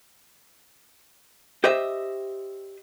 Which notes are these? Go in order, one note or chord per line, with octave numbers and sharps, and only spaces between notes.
G4 C5 D#5 E5